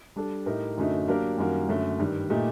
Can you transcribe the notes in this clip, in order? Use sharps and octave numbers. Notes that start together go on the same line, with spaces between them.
G3 D4 A4
A2 A3 D#4 G4 A#4
F#2 D3 F#3 A3 D#4
F#3 A#3 D4 G4 A#4
F#2 D#3 G3 A#3 F#4
F#2 D3 F#3 A3
G2 D#3 G3
A#2 A3 D#4 G4